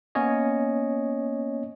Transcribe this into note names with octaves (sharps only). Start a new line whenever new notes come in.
A#3 B3 C#4 C#5 D#5